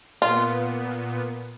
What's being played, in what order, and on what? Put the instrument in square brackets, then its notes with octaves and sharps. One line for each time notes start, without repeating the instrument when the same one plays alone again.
[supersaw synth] A#2 B3 [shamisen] F4